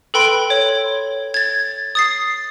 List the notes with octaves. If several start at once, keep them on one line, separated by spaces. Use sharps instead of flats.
A4 B4 G5 B5 C6 D7
C#5
G#6 A6
D#6 A6 C7